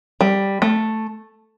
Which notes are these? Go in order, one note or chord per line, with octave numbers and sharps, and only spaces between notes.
G3
A3